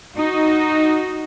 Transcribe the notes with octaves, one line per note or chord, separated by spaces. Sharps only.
D#4 F#4